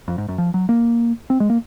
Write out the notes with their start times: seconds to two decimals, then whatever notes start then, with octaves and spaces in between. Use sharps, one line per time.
0.08 F2
0.18 G#2
0.28 F#2
0.38 F3
0.54 F#3
0.69 A#3
1.30 C4
1.40 G#3
1.50 A#3